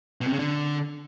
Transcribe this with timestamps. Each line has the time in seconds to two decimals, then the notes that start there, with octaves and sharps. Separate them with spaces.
0.21 B2
0.27 C3
0.33 C#3
0.39 D3